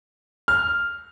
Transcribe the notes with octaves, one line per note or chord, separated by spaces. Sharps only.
F6